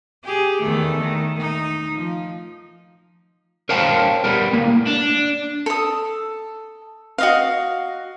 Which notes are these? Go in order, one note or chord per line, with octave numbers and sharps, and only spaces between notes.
G4 G#4
E2 D#3 A3
D#3
D#4
F3
A#4 C5 C#5 F5 G5 A5
G3 B3 A#4
A2 A#3
D4
A4 D#6
F#4 D#5 F5